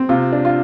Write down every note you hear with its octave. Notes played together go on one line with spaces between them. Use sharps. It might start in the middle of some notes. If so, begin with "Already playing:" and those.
Already playing: C4
C3 F4
D4
F4